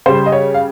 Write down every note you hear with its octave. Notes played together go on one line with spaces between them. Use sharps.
C#3 G3 C5
D#5
C#5
F5